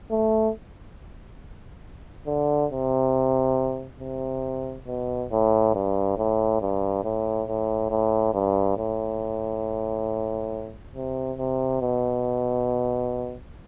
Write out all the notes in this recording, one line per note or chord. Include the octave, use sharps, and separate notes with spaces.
A3
D3
C3
C3
B2
A2
G2
A2
G2
A2
A2
A2
G2
A2
C3
C3
B2